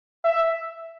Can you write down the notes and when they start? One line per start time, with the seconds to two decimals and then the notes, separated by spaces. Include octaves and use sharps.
0.24 E5